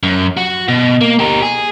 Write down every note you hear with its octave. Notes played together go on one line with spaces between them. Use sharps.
F#2
F#4
B2
A#3
G4 A#4
G#4